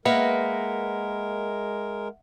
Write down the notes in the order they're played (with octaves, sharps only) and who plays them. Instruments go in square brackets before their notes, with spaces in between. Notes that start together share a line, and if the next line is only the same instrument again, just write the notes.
[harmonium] G#3 A#4 [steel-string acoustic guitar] A#3 B4 [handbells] D#5 E5 F#5